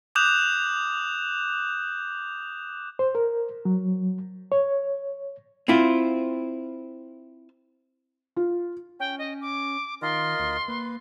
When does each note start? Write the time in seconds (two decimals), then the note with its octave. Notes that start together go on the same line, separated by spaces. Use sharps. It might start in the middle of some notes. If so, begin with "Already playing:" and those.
0.15 D6 D#6 F#6 G6 E7 F7
2.99 C5
3.15 A#4
3.65 F#3
4.52 C#5
5.68 C4 E4 F4
8.36 F4
9.00 C#4 G5
9.19 D#5
9.41 D6
10.02 D#3 F4 A#4 D#5 C6
10.39 D2
10.68 A#3 B4